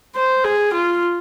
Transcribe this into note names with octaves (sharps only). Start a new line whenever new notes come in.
C5
G#4
F4